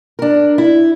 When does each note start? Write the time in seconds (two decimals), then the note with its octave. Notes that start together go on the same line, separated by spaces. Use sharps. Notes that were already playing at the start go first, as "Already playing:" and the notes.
0.19 D4 A#4
0.58 E4